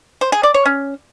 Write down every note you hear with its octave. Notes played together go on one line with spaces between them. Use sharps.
C5
G#4
D5
C#5
C#4